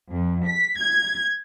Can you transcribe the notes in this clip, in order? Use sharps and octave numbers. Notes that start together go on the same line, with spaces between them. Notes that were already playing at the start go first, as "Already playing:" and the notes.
F2
B6
G#6